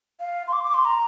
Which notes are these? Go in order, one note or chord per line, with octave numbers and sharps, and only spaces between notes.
F5
C6
D6
D6
C6
A#5